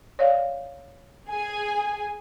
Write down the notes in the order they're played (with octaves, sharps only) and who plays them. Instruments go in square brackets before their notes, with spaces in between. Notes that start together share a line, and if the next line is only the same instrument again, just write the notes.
[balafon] C#5 D5 F5
[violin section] G#4 G#5